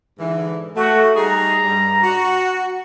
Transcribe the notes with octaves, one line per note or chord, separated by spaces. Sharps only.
G#2 D3 E3
A3 F#4
G3 D#4 G#4 A#5
G2 G3
F#4